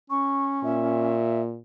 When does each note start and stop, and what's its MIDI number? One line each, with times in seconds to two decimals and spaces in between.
0.10 1.16 61
0.10 0.63 85
0.64 1.59 46
0.64 1.42 76